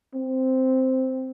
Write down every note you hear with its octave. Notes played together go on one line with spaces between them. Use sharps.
C4